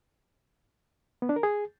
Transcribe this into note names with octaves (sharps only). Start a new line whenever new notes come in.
B3
D4
A#4
G#4